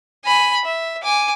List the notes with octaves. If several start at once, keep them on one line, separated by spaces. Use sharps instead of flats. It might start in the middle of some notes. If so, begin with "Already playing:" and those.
G#5 B5
E5
G#5 D6